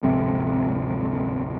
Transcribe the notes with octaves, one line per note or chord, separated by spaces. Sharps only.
D1 G#1 F2 C3